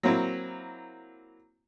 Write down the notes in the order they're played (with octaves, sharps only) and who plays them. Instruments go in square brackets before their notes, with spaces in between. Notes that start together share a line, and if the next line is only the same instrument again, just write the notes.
[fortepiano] F#3 A#3 C4 E4